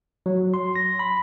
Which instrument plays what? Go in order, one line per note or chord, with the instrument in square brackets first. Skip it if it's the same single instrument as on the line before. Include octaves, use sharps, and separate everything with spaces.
[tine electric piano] F#3
C6
A#6
B5